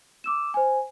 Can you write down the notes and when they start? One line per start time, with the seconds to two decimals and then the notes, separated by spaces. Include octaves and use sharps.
0.24 D6 E6 E7
0.54 C5 G#5